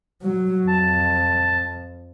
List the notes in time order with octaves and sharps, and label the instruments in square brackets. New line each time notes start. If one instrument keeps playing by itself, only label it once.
[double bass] F#3
[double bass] F2 [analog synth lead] A5